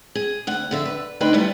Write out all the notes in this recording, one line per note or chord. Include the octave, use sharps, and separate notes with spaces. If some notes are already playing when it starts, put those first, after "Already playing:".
G#4
D2 F#5
F2 D3 E5
B4
D2 C4 D4 D#4 B4 G5
E3 G3 A3 B3